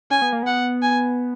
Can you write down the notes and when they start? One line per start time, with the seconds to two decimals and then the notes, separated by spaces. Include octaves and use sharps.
0.11 C#4 G#5
0.22 B3
0.32 A#3
0.43 B3 F#5
0.83 G#5